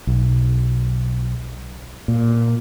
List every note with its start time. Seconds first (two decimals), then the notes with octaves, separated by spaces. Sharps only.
0.07 B1
2.08 A#2